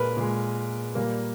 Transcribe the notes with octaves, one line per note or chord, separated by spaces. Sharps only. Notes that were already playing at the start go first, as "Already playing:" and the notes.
Already playing: A#2 G#3 A#4 B4
A#2 G#3
A#2 G3 A#3